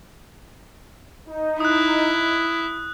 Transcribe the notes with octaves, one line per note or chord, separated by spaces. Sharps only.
D#4
E4 D#6 F#6